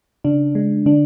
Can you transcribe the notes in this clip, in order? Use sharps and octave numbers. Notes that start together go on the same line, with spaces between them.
C#3 D4
G#3
D3 D4